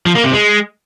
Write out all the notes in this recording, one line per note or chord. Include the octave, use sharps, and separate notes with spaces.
F3
A#3
C3
G#3